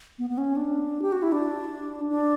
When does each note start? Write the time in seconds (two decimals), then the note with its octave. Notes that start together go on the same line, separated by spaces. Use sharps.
0.19 B3
0.30 B3
0.38 C#4
0.56 D4
1.02 G4
1.12 F#4
1.22 E4
1.32 D4
2.09 D4